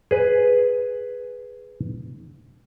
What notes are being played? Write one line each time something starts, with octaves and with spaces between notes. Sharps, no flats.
G#4 B4